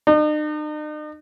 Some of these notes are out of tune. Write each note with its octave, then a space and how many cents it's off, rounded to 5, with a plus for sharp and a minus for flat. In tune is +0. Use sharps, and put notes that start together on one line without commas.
D#4 -45